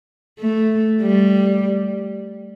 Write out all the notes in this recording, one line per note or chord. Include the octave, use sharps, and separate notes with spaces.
A3
G3